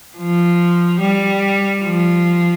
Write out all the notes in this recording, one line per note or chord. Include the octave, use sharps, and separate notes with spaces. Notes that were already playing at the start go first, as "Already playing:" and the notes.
F3
G3
F3